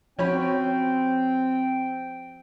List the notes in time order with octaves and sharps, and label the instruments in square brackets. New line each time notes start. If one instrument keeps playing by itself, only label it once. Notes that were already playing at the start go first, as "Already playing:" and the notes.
[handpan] F3 F#4 [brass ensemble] C4 [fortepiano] C#4 C#5 B5 [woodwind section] G5